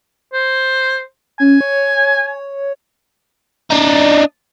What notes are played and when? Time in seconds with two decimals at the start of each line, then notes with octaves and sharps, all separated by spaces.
0.33 C5
1.40 C#4 G#5
1.61 C#5
3.71 D4 D#4